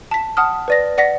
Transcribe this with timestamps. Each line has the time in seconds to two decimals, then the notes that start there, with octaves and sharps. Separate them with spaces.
0.11 A5 B6
0.37 F#5 A5 D#6 F6
0.68 B4 D5 A#6
0.98 D5 F#5 A#6 B6